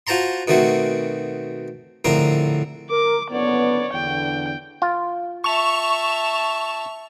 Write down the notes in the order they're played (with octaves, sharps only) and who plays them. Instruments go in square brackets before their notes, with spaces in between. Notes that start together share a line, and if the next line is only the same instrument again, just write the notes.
[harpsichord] F4 F#4 C5 A5 A#5 C6
B2 D#3 A3 C4 F#4
A#1 A2 D3 C4 A#4
[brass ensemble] A#4 [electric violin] D6
[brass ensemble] F#1 D3 B3 [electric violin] C#5 D5
[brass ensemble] E2 D3 [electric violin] G5
[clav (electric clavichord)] F4
[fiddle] E5 A5 [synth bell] C#6 F7